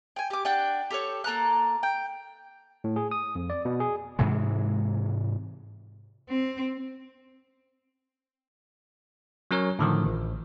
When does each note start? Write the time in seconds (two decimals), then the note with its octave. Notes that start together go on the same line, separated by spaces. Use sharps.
0.16 G5 G#5
0.30 G4 D6
0.45 D4 F#5 G5
0.90 G4 A4 B4 C#5
1.24 A#3 A4 A#5 F#6
1.83 G5
2.84 A2
2.96 G#4
3.11 D#6
3.35 F2
3.50 D5
3.65 B2
3.80 G#4
4.19 G#2 C3 E3 G#3
6.29 C4
9.51 F#3 C#4 A#4 C#5
9.79 A2 D3 D#3 F3
10.06 A1